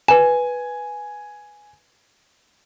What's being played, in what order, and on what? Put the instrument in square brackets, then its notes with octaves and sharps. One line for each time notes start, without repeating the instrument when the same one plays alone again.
[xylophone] B4 E7 [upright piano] G#5